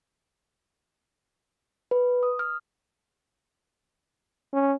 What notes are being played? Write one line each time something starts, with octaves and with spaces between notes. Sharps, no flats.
B4
D#6
F6
C#4